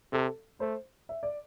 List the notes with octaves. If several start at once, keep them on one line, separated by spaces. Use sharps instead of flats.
C3 A4
A3 C5
E5
D5